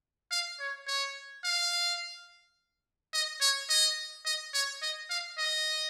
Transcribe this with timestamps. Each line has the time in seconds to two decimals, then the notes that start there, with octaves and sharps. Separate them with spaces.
0.31 F5
0.60 C#5
0.87 C#5
1.44 F5
3.13 D#5
3.41 C#5
3.70 D#5
4.26 D#5
4.54 C#5
4.82 D#5
5.10 F5
5.38 D#5